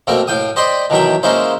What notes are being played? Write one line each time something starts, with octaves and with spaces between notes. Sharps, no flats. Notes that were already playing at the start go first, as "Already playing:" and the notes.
B2 A3 A#3 C4 A#4
A2 F5 G5 D#6
C5 D5 D#5 G5 B5 C6
B2 D#3 E3 F#3 E5 G5
G#3 A#3 C#4 D#4 E4 C5